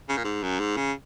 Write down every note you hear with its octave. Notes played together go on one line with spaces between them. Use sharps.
C#3
A#2
G#2
F#2
G#2
C#3